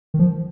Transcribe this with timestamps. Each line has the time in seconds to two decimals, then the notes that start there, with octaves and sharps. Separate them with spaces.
0.14 D#3
0.19 F3